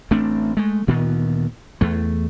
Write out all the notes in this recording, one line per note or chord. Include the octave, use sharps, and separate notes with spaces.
A1 A3 C4 D4
G#3 A3
D2 A#2 D#3 B3
E2 A3